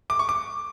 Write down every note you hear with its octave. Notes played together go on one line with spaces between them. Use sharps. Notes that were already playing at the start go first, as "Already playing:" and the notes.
D6
C#6
D6